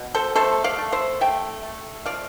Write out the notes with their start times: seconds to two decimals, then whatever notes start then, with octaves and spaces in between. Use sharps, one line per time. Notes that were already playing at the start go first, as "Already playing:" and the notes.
Already playing: B2
0.15 A4 C5
0.35 A3 A4 C5
0.64 D5 F5
0.78 A3
0.92 C5 E5
1.21 A3 E5 G5
1.63 A3
2.06 F3 D5 F5